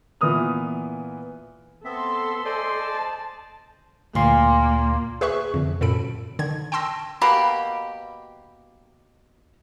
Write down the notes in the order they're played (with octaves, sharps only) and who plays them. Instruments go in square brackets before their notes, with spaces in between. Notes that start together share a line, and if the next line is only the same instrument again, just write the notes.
[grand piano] A#2 E3 B3 D#6 F6
[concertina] B3 C4 E5 [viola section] A4 C6
[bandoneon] C5 D5 [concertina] D#5 G#5
[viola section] A5
[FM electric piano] D2 C6 [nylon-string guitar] A#2 [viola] A#3
[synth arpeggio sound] G#4 B4 E5 C#6 F#6
F2 D3
F#2 A#2 A4 B5 D7
D3 D#3 G#6
G5 A5 C6 E6 A#6
[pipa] B2 A#3 G4 B5